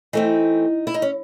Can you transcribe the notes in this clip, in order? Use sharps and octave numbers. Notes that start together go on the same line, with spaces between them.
E3 A3 C4 D#4
E4
D#4
C#4